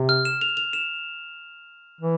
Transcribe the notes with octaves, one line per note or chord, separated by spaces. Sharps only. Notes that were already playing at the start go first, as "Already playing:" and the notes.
Already playing: C3
F6
E7
F7
F7
E7
E3